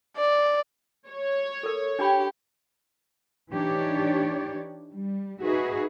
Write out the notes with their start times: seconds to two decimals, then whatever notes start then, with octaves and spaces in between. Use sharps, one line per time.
0.17 D5
1.09 C#5
1.63 A4 A#4
1.99 D4 G4 G5 B5
3.52 E3 D4 D#4 G4 C#5 D5
4.94 G3
5.43 D#4 F#4 G#4 B4 E5